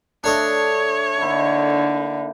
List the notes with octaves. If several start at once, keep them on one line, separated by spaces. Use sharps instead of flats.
D3 A3 D4 A4 C#5 D#5
D3 A#3 D#4 E4